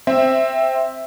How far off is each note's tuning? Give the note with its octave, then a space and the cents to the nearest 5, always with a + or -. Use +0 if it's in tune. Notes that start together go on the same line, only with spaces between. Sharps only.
C4 +5 E5 +0